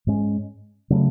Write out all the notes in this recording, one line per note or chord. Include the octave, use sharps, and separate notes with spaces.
G#2 G#3 C#4
C#3 F#3 A3